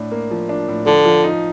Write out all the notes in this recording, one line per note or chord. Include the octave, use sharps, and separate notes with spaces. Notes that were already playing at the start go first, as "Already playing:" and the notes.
Already playing: A2 D4
A#3
F3
D4
A2
D3 F3
F3
D#4